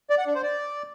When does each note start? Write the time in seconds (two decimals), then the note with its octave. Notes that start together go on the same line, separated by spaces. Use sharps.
0.10 D5
0.18 F#5
0.27 D4
0.35 C5
0.43 D5